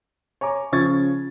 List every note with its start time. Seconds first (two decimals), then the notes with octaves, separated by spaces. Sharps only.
0.41 C#5 G#5 A#5 D6
0.72 C#3 F3 C#6 G#6 A6